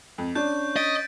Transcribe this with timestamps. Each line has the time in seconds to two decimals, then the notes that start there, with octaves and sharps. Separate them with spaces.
0.18 F2
0.35 C#4 D4 C#5 C#6 G6
0.76 D#5 A6 B6 D7